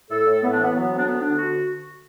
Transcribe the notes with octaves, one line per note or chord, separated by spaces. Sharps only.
A2 A4
A2
A2 B3
D4
E3 B3
F#3 B3
D2
D4
D2 B3
D3 D4
F#4